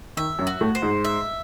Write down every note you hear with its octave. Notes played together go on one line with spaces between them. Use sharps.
D#3 E5
F#2 F#3
F#4
A2 A3
C5
G#2 G#3
E5